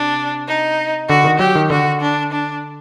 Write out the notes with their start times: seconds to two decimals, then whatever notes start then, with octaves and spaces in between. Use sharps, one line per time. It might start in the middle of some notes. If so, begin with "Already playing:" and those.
Already playing: C3 D4
0.48 D#4
1.09 D3 F#4
1.24 D#3
1.39 F#3 G4
1.56 D#3
1.70 D3 F#4
2.01 D4
2.32 D4